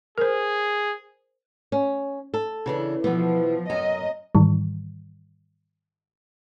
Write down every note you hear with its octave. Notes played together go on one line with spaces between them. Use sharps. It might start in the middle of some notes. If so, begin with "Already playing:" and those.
G#4 A#4 C5
C#4
A4
C#3 E3 D4
B2 E3 F3 B3
F#2 D#5 G#5 A#5
G#2 D#3 E3 G3